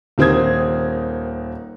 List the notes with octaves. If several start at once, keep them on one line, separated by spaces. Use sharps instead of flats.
D#1 D#3 C4 D#6 G#6